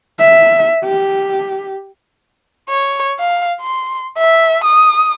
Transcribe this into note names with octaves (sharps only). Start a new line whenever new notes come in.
E5
G4
C#5
F5
C6
E5
D#6